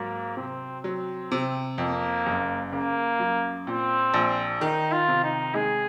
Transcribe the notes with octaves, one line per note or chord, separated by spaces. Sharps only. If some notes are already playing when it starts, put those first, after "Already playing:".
Already playing: G#2 F#3 A#3
C3 C4
F#3 C4
C3
F2 A#3
F#1
C#3 A#3
F#2
A#2 C4
A#1
D#3 D#4
F4
C3
D#4
G#3 G#4